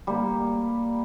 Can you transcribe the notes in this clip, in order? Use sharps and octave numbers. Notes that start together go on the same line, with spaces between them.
G3 A#3